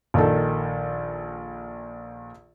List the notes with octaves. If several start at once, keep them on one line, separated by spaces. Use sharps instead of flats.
A#1 D#3 A4